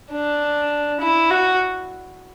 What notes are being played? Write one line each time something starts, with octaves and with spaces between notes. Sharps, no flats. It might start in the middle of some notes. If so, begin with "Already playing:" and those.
D4
E4
F#4